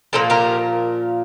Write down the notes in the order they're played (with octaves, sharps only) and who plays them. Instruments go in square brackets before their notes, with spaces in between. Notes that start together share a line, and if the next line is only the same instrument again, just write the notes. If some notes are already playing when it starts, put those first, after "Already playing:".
[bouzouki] A#2 F3 A#3 A4 C5
G4 A#4